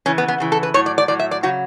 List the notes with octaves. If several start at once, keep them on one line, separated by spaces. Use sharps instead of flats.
C#3 E3 C#4
B3
B3
C#3 E3
A4
B4
A2 F#3 C#5
D5
D5
A2 F#3 D5
E5
D5
C#3 F#3 F#4